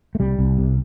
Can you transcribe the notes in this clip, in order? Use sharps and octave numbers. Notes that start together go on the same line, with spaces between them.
A3
C2 G3
C2
C3